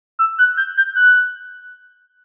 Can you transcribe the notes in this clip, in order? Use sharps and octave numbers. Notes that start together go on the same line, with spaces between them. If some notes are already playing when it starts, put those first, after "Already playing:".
E6
F#6
G6
G6
F#6